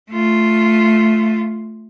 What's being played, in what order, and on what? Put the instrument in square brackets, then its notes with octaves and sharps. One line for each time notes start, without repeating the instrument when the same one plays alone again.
[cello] A3 F4